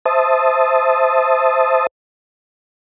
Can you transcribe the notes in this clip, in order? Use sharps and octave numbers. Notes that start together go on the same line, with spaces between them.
C5 E5 A5 D#6